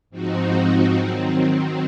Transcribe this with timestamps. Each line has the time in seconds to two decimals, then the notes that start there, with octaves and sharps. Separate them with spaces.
0.10 G#2 F3 C4 D#4 F#4
0.94 D#3 F#3 C4